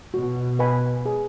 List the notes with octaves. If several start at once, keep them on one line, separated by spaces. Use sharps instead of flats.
B2 F#4
B4 D#5 G#5 B5
G#4